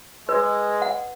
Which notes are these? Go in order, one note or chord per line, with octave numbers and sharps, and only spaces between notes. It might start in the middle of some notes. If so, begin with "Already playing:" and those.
G#3 B4
F#5